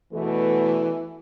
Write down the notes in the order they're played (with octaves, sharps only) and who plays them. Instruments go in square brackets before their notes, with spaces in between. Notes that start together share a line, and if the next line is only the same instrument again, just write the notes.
[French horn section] E2 B2 A3 [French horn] E3